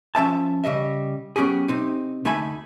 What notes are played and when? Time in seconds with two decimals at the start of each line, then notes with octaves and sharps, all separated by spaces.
0.15 F3 C#4 E5 A5
0.64 C#3 G3 D#5 E5
1.36 F#3 B3 C#4 G4 G#4
1.68 C3 C4 D#4
2.25 D2 A3 D#4 E5 G#5 B5